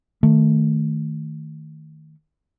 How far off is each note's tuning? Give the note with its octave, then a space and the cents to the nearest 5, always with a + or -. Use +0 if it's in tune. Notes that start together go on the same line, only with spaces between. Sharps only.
D#3 +0 A3 +10